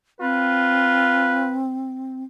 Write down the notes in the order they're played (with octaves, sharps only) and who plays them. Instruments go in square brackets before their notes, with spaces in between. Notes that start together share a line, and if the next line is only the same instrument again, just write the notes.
[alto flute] C4 [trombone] F4 [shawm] B4